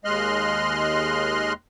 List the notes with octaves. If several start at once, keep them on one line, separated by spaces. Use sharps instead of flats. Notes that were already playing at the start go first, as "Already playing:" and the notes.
D#2 G#3 D#5 C6 F6 F#6